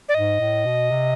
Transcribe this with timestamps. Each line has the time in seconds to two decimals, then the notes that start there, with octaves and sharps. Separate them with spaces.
0.09 D5
0.14 G#2 D#5
0.40 A2
0.65 B2
0.91 C3